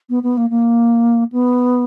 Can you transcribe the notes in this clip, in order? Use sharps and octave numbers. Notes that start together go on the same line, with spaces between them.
B3
B3
A#3
A#3
B3